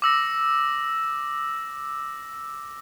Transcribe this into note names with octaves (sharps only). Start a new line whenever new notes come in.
D6 E6 A#6